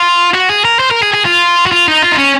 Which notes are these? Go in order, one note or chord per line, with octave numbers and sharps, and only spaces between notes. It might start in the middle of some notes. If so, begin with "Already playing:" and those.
Already playing: F4
F#4
G#4
A#4
C5
A#4
G#4
G#4
F4
F#4
F4
D#4
F4
D#4
C#4